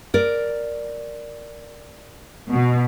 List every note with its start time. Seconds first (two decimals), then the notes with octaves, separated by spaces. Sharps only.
0.14 A#4 D5
2.50 B2